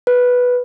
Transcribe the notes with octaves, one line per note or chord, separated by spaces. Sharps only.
B4